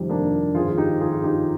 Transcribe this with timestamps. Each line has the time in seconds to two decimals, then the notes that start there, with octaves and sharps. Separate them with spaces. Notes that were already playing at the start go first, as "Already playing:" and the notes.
Already playing: F2 C3 D#3 G3
0.09 A#3 D4
0.55 G#1 G2 F3 F4 G#4
0.69 F4
0.77 D#4 G4
1.00 F4 G#4
1.12 F4
1.24 D#4 G4